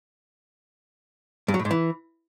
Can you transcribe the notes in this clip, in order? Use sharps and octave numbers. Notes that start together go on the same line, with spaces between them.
G2
F#3
A2
G#2
E3